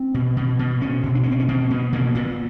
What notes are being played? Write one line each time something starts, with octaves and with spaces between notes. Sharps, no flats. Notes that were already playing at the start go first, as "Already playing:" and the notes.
Already playing: C4
B2
B2
B2
B2 C#4
B2
D4
C#4
B2
C4
C#4
B2 C4
B2 B3
B2 A#3
A#2 B3